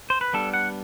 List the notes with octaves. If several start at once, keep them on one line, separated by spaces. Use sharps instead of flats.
C5
B4
G3 B3 D4 A4
F#5